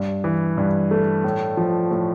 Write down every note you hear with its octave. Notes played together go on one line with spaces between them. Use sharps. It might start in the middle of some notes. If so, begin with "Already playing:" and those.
Already playing: G2
E3
G2
A3
A2
F3
A2